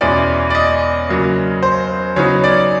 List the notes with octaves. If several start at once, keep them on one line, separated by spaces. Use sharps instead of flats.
E2 B2 G#3 C#4 E4 D5
D5
D#5
C#3 F#3 A#3
C5
C#3 F#3 B3 D#4 C#5
D5